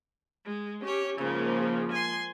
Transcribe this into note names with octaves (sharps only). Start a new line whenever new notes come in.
G#3
C#4 G4 C#5
G#2 C#3 F3 G#3 A#3
G#5 C6